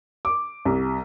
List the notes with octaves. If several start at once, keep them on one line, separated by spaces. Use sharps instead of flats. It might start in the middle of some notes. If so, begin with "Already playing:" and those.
D6
C2